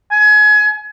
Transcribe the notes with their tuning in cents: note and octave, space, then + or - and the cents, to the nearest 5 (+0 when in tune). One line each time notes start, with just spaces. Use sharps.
G#5 +30